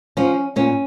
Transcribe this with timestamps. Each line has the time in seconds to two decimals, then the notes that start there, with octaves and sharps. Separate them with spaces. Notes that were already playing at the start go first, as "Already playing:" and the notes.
0.17 F3 C#4
0.56 A#2 C#4